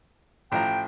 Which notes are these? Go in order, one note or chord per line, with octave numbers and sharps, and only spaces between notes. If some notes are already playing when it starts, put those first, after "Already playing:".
A1 F3 G5 A#5